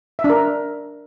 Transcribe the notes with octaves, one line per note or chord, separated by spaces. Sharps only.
E5
D4
A#4